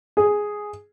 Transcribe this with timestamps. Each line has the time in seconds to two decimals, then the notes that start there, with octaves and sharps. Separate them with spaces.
0.17 G#4